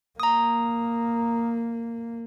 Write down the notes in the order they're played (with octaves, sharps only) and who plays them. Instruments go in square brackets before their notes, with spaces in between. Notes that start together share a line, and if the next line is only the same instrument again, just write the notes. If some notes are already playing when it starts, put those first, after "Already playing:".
[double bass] A#3 [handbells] A#5 D#6